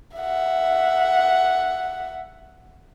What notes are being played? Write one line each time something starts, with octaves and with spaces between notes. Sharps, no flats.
E5 F#5